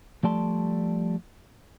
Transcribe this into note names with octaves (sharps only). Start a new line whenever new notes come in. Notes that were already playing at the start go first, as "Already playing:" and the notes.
F3 G3 A3 D5 A5 C6